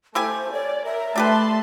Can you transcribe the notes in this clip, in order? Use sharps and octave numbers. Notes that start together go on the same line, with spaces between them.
A3 E4 G4 C5 G#5
C#5 D5
A#4 E5
A3 D4 G4 B4 A5 B5 C6